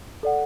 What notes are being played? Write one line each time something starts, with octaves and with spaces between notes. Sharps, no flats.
A4 D5 F#5